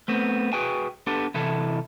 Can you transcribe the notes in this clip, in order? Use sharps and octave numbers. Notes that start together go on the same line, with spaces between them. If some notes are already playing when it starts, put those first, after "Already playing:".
A3 B3 C4
F#4 G#4 B4 G5 G#5
B3 D4 G4 A4
C3 E3 E4 A4